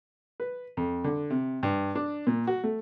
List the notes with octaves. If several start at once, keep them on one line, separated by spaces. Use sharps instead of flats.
B4
F2
D3
C3
G2
D4
A#2
F#4
A3